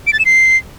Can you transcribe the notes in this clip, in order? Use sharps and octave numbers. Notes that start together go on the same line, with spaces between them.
D7
A6
E7
C7